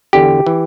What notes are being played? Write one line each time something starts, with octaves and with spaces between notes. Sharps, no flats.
E2 D3 G4
E3